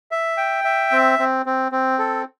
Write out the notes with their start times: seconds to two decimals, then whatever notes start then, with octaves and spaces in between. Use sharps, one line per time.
0.11 E5
0.37 G5
0.64 E5
0.92 C4
1.19 C4
1.46 C4
1.72 C4
1.99 A4